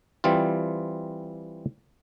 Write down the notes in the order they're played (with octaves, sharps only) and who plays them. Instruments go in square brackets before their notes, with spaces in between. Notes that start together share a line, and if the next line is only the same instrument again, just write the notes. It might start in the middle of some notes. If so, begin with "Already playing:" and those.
[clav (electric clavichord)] E3 G3 C4 F4